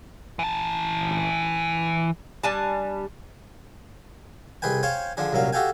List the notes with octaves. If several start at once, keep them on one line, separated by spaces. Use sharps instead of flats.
E3 A5
G3 D4 G#5 A5
C2 G#4 B4 G5 G#5
C5 C#5 F5 G5 G#5
D3 F3 D4 G#4
C2 A#2 F#3 C#4 F5
F#4 G4 A4 F5 G5 G#5